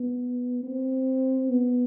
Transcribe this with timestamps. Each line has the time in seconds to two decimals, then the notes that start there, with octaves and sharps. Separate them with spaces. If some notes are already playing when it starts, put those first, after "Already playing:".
Already playing: B3
0.63 C4
1.49 B3